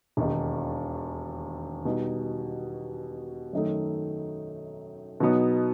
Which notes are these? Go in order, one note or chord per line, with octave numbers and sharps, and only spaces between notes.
E1 D#2 D#3
B2 G3 D#4
F#2 D#3 A3 D#4
B2 F#3 B3 D#4